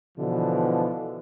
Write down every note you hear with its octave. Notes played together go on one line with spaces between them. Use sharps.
B2 D3 E3 F3